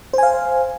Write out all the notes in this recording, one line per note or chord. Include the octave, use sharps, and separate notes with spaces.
C5 F5 G#5